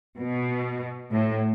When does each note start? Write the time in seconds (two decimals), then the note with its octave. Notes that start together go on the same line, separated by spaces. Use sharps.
0.19 B2
1.12 A2